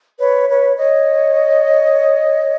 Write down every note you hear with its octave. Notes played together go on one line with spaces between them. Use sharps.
B4 C#5
B4 C#5
C#5 D#5